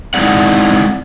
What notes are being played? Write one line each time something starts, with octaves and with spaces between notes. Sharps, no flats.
G#3 C4 D#4 E4 D5 F#5